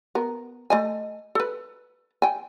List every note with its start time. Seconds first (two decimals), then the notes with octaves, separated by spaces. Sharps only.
0.15 B3 A#4
0.70 A3 D#5 G#5
1.35 A4 B4
2.22 G5 G#5